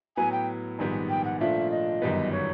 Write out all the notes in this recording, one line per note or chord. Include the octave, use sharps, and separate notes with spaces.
A2 F#3 B3 G#5
G5
A#1 G#2 D#3 G3 B3
G5
F#5
A#2 F3 A3 D4 F4 E5
D#5
G1 F#2 D#3 G3 B3
C#5